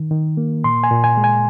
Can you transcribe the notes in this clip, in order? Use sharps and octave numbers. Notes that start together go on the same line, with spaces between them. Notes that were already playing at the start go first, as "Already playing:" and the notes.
Already playing: D#3
D#3
A#3
A#2 C6
G#5
A#2
G#5
G#3
G#5